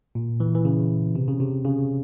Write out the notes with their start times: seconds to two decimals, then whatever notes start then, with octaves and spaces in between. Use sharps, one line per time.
0.15 A#2
0.40 E3
0.55 E3
0.65 C#3
1.16 C3
1.28 C#3
1.40 C3
1.65 C#3